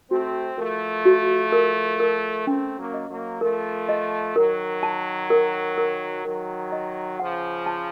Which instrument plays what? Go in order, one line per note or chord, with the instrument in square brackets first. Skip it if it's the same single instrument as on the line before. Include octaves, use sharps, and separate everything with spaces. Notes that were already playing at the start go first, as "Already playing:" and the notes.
[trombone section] A3 C4 [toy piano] F#4
[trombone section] F3 A3 [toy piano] A#4
[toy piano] F#4
A#4
A#4
[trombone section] A3 C4 [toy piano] C#4
[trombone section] F#3 A#3
[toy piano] D#5
[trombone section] F#3 A#3
[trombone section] F3 A3 [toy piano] A#4
[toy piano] D#5
[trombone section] D#3 F#3 [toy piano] A#4
[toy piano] A5
A#4
A#4
[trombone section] D#3 F#3 [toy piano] A#4
[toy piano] D#5
[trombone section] C#3 F3 [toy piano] F#5
[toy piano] A5